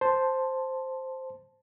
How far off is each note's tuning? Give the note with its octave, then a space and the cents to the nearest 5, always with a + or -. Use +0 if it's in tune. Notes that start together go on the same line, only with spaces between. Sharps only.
C5 +0 A5 +0